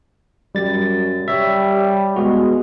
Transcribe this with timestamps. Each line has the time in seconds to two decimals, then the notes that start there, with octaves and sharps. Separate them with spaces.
0.55 F#2 G3 A6
1.28 G3 C#5 E5
2.16 G#3 B3 F#4